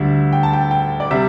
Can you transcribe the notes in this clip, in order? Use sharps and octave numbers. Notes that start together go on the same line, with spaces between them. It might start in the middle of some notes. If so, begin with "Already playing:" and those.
Already playing: D2 D3 G3 E5
G5
A5
G5
G5
D5
C3 G3 E5